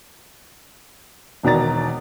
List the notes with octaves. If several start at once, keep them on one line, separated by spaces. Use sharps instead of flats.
E1 B2 D#3 D5 A#5 A6